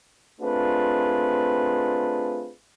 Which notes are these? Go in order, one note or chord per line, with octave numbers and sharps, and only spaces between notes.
A3 C4 D4 F4 G#4 B4